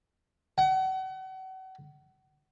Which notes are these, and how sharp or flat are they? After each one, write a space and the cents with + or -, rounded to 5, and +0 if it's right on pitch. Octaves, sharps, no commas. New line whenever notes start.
F#5 +35